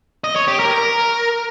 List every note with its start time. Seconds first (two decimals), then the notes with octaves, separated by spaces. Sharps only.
0.24 D#5
0.36 C#5
0.48 G4
0.60 A#4
0.71 A#4